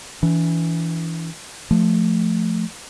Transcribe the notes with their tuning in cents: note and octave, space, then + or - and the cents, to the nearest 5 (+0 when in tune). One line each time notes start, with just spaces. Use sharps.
E3 +0 D4 -35
F3 +0 A3 +0